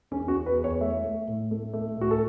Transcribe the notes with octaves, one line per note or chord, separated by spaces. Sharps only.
E2 C#4
F#4
E2
B4
E2
C#5
A3 E5
A3
A2
A3
A3
A2 F#4
A4